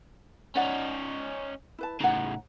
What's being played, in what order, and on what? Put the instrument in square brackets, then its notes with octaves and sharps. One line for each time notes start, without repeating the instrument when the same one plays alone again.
[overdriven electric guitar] C#4 D#4 [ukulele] D5 F#5
[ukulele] E4 B4 A5
[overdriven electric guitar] A2 C#3 [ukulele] D#4 F#5